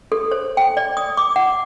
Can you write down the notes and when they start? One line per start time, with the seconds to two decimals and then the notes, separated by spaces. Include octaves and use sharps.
0.12 A4
0.32 C5
0.57 G5
0.77 D5
0.97 D#6
1.17 D6
1.36 F#5